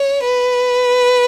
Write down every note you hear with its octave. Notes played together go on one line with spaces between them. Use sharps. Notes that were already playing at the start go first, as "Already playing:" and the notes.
Already playing: C#5
B4